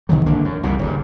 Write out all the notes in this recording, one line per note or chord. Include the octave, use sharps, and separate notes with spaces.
B2 D#3 E3 F#3
G#1 D3 A#3 D4
F#2
C2 F2 A#2
F#1 D2 G2